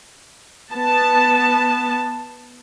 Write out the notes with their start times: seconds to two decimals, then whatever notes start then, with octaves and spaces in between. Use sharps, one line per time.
0.73 B3 A5